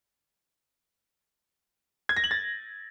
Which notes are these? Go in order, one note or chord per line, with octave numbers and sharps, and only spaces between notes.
G#6
A#6
F#7
A6